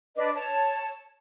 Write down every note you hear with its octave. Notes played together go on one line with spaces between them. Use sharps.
D4 B4 D#5
C#5 A5